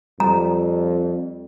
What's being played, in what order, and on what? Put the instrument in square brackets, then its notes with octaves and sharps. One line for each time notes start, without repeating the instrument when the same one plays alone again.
[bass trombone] F2 [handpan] G3 [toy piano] A#5